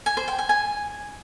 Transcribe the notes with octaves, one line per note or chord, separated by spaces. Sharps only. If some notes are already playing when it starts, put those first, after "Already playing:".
G#5
C5
G5
G#5
G#5